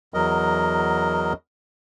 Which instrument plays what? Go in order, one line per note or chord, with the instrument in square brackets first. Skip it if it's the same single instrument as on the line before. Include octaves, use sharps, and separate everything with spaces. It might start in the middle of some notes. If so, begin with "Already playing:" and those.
[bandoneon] E2 F#3 A#4 D#5